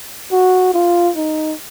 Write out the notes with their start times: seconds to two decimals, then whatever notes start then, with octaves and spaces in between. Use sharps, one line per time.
0.32 F#4
0.74 F4
1.16 D#4